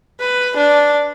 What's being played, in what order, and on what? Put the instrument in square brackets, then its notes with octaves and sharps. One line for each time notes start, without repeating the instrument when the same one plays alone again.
[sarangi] B4
D4